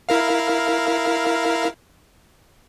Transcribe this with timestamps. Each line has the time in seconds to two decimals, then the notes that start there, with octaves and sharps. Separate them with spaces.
0.09 E4 A#4 F5